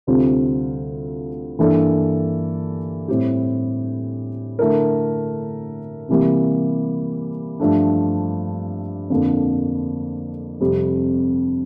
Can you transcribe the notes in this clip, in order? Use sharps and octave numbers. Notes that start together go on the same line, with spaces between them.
D2 C3 G3 C4 F4
G2 E3 A#3 D4 A4
A2 G3 C4 E4 G4
D3 A3 E4 A#4
C3 E3 G3 A#3
G2 F3 A3 D4
F2 D3 F3 A#3 D4
F2 C3 G3 C4